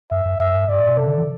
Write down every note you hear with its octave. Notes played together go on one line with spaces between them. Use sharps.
F#2 E5
F#2
F#2 E5
G2
G2 D5
A2
B2
C3 A4
D3
E3